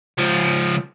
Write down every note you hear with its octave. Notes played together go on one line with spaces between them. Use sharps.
C#2 F3